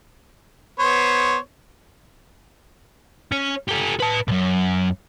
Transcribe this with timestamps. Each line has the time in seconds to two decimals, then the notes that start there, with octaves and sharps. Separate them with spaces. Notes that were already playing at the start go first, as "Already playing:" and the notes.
0.79 B3 C5 C#5
3.32 C#4
3.68 G4 A4
4.00 B4 A5
4.28 F#2 B2